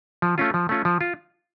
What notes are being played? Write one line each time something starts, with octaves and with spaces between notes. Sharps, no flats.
F3
A3 C#4 F4
F3
A3 C#4 F4
F3
F4